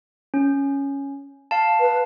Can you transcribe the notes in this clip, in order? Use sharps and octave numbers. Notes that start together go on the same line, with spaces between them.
C#4
F5 A5
B4